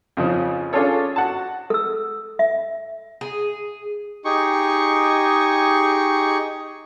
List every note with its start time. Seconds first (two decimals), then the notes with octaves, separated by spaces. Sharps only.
0.17 F2 C#3 F3 C#4
0.73 C#4 D4 F4 G#4 A4 C#5
1.16 F#4 F#5 A5
1.70 A4 E6
2.39 E5
3.21 G#4
4.25 D#4 G4 G#4 C#6